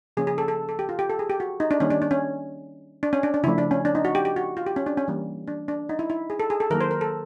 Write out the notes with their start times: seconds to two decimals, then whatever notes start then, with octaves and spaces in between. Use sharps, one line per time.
0.17 C#3 F3 A#3 C#4 G#4
0.27 G#4
0.38 A4
0.48 A4
0.69 A4
0.79 G4
0.89 F4
0.99 G4
1.10 A4
1.19 G#4
1.30 G4
1.40 F#4
1.60 D#4
1.71 D4
1.80 D#3 G3 A#3 C#4
1.90 D4
2.02 D4
2.11 C#4
3.03 D4
3.13 C#4
3.23 D4
3.34 D4
3.43 C#3 E4
3.47 F3 A3
3.58 D4
3.71 C#4
3.85 D4
3.95 D#4
4.05 F#4
4.15 G4
4.25 G4
4.36 F#4
4.57 F4
4.66 G4
4.76 C#4
4.86 D4
4.97 C#4
5.08 E3 G3 A#3 C#4
5.48 D4
5.68 D4
5.89 D#4
5.99 E4
6.10 E4
6.30 G#4
6.40 A4
6.50 G#4
6.60 A4
6.70 D#3 F#3 A#3 A#4
6.81 C5
6.91 A#4
7.01 A4